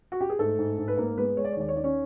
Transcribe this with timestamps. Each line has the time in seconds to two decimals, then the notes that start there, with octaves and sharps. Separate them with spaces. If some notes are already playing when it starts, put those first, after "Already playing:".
0.12 F#4
0.21 G4
0.30 G#4
0.39 G#2 A3 A4
0.59 G#2
0.78 G#2
0.88 B4
0.97 G#2 A#3 A#4
1.18 G#3 B3 B4
1.37 G#3 C#5
1.44 D5
1.52 C#5
1.57 D#2 D5
1.69 C#5
1.76 D#3 D5
1.84 C#4 C#5